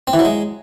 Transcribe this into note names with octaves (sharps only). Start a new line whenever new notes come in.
C4
E3
F#3
G#3